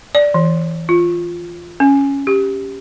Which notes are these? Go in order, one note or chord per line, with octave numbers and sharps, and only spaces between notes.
D5
E3
F4
C#4
G4